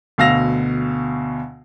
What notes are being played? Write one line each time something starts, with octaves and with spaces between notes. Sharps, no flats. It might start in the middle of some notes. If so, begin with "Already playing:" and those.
D2 B2 F5 E6 A#6 F7